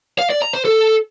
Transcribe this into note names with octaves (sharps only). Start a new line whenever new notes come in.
F5
D5
A#5
C5
A4